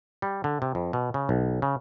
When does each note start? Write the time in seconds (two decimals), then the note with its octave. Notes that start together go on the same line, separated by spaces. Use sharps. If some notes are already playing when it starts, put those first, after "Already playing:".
0.22 G3
0.44 D3
0.62 C3
0.75 F2
0.93 B2
1.14 C#3
1.29 B1
1.62 C#3